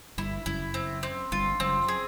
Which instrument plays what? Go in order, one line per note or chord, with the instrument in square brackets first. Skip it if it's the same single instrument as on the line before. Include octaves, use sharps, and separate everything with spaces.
[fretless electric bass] G1 G2 [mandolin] E4
[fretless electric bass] F#1 F#2 [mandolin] E4
[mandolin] C4
C4
[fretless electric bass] G1 G2 [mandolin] F4
[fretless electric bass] F#1 F#2 [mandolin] C4
[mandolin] G#4